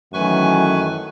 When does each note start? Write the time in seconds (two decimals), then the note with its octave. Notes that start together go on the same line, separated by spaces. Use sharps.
0.13 F#2 D#3 E3 A3 B4 G#5 C#6